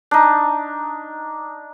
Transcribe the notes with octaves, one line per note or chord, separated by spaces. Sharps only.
D4 D#4